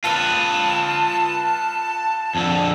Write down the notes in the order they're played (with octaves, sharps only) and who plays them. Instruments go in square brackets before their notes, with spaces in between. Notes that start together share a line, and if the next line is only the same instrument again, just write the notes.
[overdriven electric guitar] F4 B4 [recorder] A5
[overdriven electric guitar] F2 D3